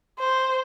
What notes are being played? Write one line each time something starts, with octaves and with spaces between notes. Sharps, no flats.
C5